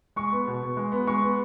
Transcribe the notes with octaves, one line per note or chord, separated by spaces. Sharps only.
G#3 C#6
B3
B2
B2
G#3
B3
G#3 C#6
B3